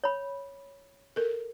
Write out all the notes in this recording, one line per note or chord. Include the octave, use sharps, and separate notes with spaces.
C#5 B5
A4 A#4